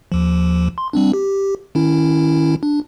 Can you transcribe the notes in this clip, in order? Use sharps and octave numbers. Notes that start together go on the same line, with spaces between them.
D#2 F3
C6
G3 C4 D4
G4
D#3 C#4 E4
D4